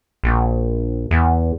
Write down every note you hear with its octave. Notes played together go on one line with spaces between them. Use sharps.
A#1
E2